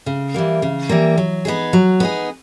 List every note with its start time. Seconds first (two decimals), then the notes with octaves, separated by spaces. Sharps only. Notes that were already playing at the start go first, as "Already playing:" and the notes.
0.06 C#3
0.34 E3 G3 A#3
0.62 C#3
0.89 E3 G3 A#3
1.18 F#3
1.45 B3 D#4 G#4
1.73 F#3
2.00 B3 D#4 G#4